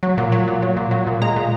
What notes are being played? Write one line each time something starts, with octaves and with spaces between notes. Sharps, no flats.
F#3
A#2
F#3
A#2
F#3
A#2
F#3
A#2
G#3 A#5
A#2